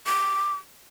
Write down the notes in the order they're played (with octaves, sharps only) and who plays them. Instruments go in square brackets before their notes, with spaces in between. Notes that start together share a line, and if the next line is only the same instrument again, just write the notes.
[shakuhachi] D6